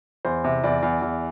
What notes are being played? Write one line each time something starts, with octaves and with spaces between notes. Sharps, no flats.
E2 C5
C3
E2 D5
E2
E2